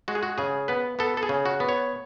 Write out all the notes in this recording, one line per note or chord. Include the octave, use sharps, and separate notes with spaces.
G#3 F#4
G#4
F#4
C#3 G#4
B3 B4
B3 A4
A4
G#4
C#3
F#4
B3
C#5